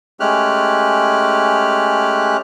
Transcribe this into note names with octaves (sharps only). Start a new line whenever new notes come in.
G#3 A3 C#4 G4 F6 F#6